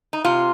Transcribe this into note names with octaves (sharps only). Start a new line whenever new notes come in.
D#4
C3 F4